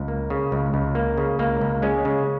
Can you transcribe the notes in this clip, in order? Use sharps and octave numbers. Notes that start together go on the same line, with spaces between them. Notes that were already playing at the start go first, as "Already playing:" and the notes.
Already playing: C#2
A#3
C#3
C#2
C#2
A#3
C#3
C#2 A#3
C#2
G#3 C#4
C#3